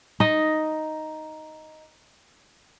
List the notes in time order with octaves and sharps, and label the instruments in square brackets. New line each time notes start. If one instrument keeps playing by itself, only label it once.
[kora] D#4 D#5